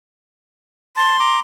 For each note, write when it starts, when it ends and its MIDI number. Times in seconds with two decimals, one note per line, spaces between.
0.97 1.17 81
0.97 1.38 84
1.20 1.40 82
1.20 1.40 86